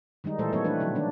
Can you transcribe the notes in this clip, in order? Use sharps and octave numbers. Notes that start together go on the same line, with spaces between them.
D#3 G3 G#3 D#4
A#2 E3 G#3 A3 A4 C5
F3 G3 A#3 C4 A4 C#5
E3 A3 D4 B4
B2 D3 F3 F#3
D#3 A#3 D4